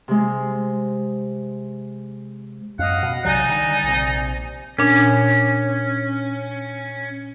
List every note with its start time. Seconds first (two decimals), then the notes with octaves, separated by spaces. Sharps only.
0.08 C3 G#3
2.79 F#2 D#5 F5 F#5
3.03 B2
3.25 B1 C3 F#3 D#4 D5 G#5
3.49 D3 D#3 G3
3.84 A#1 C3
4.79 A#2 C#4 D4